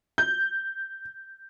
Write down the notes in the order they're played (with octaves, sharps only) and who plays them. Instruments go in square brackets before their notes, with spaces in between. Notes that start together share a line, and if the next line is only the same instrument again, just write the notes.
[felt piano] G6